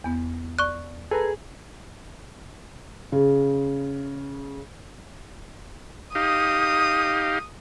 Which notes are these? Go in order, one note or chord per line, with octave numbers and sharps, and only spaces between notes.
E2 B3
D5 C#6 F#6
G#4 A4 B4 A#5
C#3
D#4 G4 F5 D#6